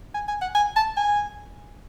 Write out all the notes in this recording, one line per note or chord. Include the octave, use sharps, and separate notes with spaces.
G#5
G#5
F#5
G#5
A5
G#5